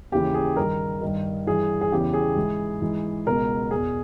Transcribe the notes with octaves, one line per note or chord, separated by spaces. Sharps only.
D#2 C#3 E3 G4
G#4
G2 D#3 A#4
G2 D#3
G2 E3 G#4
G#4
E2 C#3 E3 G4
G#4
G#2 E3
G#2 E3
C#2 B2 A#4
E2 B2 G#4